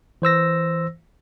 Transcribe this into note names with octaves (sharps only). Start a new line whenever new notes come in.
E3 C5 E6 A#6